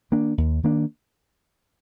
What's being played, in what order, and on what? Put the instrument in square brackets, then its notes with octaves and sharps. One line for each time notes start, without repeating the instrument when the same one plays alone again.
[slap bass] D#3 A#3 D4
D#2
D#3 A#3 D4